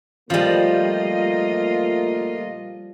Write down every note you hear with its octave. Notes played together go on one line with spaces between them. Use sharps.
A#2 F3 G3 A3 A#3 F4 D#5